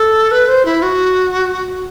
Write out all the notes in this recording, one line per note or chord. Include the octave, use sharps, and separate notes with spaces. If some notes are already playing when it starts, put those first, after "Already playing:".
Already playing: A4
B4
C5
E4
F#4